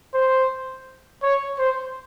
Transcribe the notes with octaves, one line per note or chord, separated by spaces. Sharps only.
C5
C#5
C5